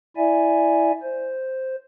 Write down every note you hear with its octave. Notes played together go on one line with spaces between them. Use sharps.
E4 D5 E5 G#5
C5